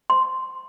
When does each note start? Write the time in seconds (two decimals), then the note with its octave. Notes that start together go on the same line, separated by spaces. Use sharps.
0.10 C6